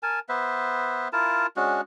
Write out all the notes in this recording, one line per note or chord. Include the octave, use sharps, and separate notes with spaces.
A#4 G#5 A5
B3 B4 C5 E5
E4 F4 A#4 A5
G#3 C#4 D4 F#4